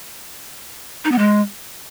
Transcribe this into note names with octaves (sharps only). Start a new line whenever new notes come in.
D#4
B3
G#3